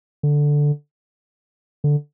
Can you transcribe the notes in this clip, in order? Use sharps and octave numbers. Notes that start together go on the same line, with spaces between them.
D3
D3